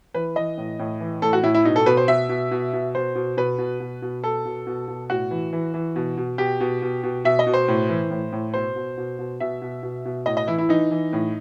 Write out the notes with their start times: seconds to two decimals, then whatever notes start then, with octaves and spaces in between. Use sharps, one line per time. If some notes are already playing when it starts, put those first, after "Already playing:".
0.14 E3 B4
0.36 E3 D#5
0.58 A2
0.79 A2
1.00 E3
1.22 A2 A4
1.33 F#4
1.43 A2 E4
1.54 E4
1.65 B2 D#4
1.76 A4
1.86 B2 B4
1.97 C5
2.08 B2 E5
2.29 B2
2.51 B2
2.73 B2
2.95 B2 C5
3.15 B2
3.37 B2 B4
3.58 B2
3.80 B2
4.02 B2
4.24 B2 A4
4.45 B2
4.67 B2
4.88 B2
5.10 A2 F#4
5.31 E3
5.53 E3
5.74 E3
5.96 B2
6.17 B2
6.38 B2 G4
6.60 B2
6.82 B2
7.03 B2
7.24 B2 E5
7.39 D#5
7.47 B2
7.54 C5
7.68 A2
7.89 E3
8.11 A2
8.32 A2
8.54 B2 C5
8.76 B2
8.97 B2
9.19 B2
9.40 B2 E5
9.62 B2
9.83 B2
10.05 B2
10.26 A2 D#5
10.37 D#5
10.47 E3 E4
10.58 E4
10.69 E3 D#4
10.91 E3
11.13 A2